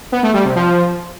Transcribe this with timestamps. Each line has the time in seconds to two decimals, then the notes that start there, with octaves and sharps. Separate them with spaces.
0.12 B3
0.23 A3
0.34 G3
0.45 C3
0.55 F3